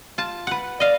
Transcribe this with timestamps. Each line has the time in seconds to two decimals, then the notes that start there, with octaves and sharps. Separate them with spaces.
0.18 F4 A5
0.47 B4 F#5
0.80 D5 D#5 F5